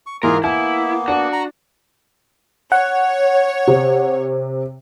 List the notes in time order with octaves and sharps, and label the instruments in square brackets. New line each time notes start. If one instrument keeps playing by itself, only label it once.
[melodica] C#6
[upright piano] G#2 E3 [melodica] A#3 F4 G#4 [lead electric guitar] A#4
[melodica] A#3 B3 [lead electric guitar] E4 [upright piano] G#5
[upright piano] D4 [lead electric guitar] F#4
[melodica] A#5
[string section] C#5 [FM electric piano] F#5
[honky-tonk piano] C3